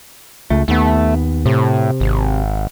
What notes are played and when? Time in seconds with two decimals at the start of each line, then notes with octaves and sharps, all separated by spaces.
0.50 C#2 A3
0.68 D#2 A3 B3
1.46 A2 C3
2.00 G#1